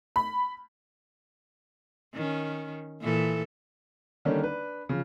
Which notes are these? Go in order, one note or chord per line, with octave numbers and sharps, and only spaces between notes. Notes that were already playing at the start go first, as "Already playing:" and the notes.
B5
D#3 C#4
A#2 E3 A4
D3 D#3 G3 A#3 C#4 D4
D4 B4
C#3 F3